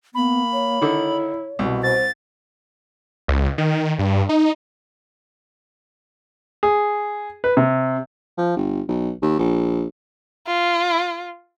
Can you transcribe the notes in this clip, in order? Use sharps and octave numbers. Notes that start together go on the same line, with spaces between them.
A#3 B3 B5
C#5
D3 D#3 E4
C2 B2
C5 A6
C#2
D#3
G2
D#4
G#4
B4
C3
F3
G1
B1
D#2
A#1
F4